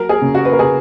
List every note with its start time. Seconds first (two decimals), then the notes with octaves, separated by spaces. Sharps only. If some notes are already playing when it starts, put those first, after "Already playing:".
Already playing: F#3 A#4
0.09 G#4
0.22 C#3
0.35 F#4
0.45 B4
0.53 A#4
0.59 C#3 G#4